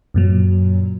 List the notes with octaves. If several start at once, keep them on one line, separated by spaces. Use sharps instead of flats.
F#2 A#2 F#3